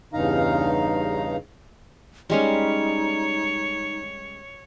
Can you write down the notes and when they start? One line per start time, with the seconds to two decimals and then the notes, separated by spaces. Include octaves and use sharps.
0.13 E2 G2 C#3 D#4 F5 A#5
2.30 G3 G#3 C#4 D#4 C#5